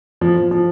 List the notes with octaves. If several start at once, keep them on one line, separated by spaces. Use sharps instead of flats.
F3
F3
F3